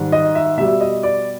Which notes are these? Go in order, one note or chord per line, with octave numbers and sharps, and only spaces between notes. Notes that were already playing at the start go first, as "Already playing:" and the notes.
Already playing: G#2 D#3 G3
D#5
E5
B2 G3 E5
D#5
D5